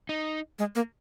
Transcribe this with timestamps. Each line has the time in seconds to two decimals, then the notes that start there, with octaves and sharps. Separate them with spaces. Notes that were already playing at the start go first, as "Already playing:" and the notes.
0.09 D#4
0.59 G#3
0.75 A#3